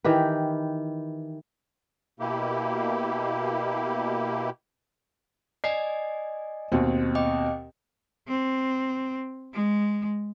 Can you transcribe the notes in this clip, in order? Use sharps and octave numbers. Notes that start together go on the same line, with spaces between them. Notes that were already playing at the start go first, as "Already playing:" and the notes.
D#3 E3 G4 B4
B2 A#3 E4 G4
D5 D#5 G#5 C7
D#2 B2 C4
D#5 G5 D6
C4
G#3